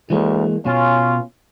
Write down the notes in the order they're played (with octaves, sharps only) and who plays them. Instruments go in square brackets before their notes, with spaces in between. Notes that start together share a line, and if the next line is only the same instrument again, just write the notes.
[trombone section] D2 [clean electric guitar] E3 G#3 A#3
[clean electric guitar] B2 [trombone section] C#4 F4